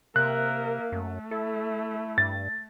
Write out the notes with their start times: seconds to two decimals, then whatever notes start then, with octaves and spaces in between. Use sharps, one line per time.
0.16 C3 A#3 A#4 E5 F#6
0.92 F#2 A3
1.31 E4 A4
2.18 G2 A6